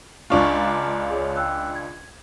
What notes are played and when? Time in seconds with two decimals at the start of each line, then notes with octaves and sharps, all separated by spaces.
0.30 C#2 D4 F4 A#5 C#6
0.53 A#5 D6
1.10 G#4 C#5
1.35 G5 E6 F#6
1.75 G#6